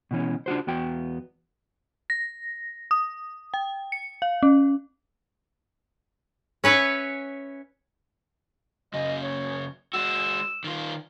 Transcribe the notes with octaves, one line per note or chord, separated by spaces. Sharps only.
B2 E3 C#4
D4 F4 F#4 C5
E2 B3 F#4 G5
A#6
D#6
G5
C#7
F5
C#4
C#4 B4 C#5 E5 G#5
F#2 C#3 D#5
C#5
G#3 F#4 E6
D#3 F4